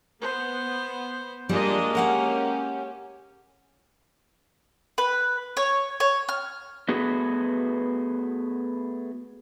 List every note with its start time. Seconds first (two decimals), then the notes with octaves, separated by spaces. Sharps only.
0.21 B3 C5
1.49 G3 G#3 A#3 D4 F4 D#5
1.95 C#4 G4 A#4 F#5 G#5
4.98 B4
5.57 C#5
6.00 C#5
6.29 F6
6.88 A3 B3 F#4 G#4 B4